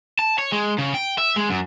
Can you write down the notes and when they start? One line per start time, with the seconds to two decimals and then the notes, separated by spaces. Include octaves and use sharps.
0.19 A5
0.38 C#5
0.52 G#3
0.78 C#3
0.94 G5
1.18 E5
1.36 G#3
1.50 F#2